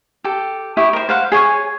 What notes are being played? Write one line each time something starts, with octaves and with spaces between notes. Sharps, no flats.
G4 A4
E4 G4 C#6 D#6
A#4 C5
C5 F5 F#5
G#4 C#5 G#5 C#6